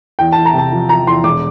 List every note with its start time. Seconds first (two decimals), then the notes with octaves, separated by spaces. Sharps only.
0.19 E2 G5
0.32 A5
0.37 E2
0.45 A#5
0.54 C3 A5
0.72 F3
0.89 F3 A#5
1.07 E2 C6
1.24 E1 D6